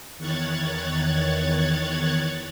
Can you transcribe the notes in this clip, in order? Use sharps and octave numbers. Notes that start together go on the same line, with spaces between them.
E2 D#3 C#5 F#6 G#6 A6